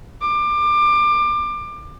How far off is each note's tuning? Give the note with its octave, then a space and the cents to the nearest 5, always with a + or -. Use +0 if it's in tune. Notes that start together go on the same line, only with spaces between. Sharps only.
D6 +25